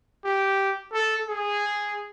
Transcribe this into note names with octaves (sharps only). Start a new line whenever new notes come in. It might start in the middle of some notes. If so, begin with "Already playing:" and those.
G4
A4
G#4